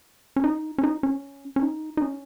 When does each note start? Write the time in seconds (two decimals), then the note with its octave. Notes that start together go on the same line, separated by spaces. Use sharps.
0.36 C#4
0.44 D#4
0.78 C#4
0.83 D#4
1.03 C#4
1.56 C#4
1.62 D#4
1.97 D#4
2.02 C#4